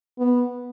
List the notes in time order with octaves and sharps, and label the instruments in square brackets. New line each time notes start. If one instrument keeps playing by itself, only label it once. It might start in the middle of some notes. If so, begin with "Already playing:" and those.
[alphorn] B3